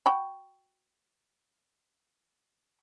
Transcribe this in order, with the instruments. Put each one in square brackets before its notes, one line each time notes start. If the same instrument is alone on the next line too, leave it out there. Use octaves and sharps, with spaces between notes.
[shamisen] F#4 G5 B5